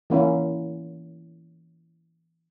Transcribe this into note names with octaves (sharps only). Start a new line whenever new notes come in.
E3 A#3 C#4 E4